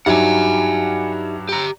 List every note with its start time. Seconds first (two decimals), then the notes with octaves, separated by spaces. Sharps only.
0.06 G2 F#3 D#4 G4 E5 F#5 G#5
1.49 G4 A#5